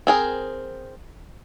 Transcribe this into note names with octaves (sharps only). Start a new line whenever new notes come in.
C4 G#4 A#4